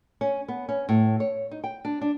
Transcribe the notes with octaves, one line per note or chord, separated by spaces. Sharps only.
C#4
B3
C#4
A2
C#5
D#4
G5
D4
D4